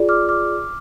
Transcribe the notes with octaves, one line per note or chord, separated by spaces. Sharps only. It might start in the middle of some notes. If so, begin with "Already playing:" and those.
Already playing: F4 G#4 D5
D6 F6
D6 F6